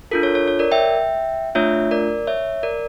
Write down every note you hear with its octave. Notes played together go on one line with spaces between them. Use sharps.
D4 F4 A4 A#4
C#5
C#5
C#5
A#4 D5
E5 G5
A3 D4 F4 C#5 E5
A#4 D5
C#5 E5
A#4 D5